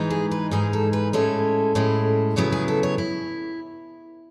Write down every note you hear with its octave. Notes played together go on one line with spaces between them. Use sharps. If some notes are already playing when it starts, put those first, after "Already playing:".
Already playing: G#2 E3 G#3 D#4
G#4
B4
G#2 E3 G#3 D#4 G#4
A4
B4
A2 G#3 C#4 E4 A4
A2 G#3 C#4 E4
C#3 F#3 B3 E4 G#4
G#4
A4
C#5
E4